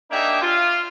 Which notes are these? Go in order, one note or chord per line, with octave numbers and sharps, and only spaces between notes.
A#3 D4 D#4 G4 G#4 E5
F4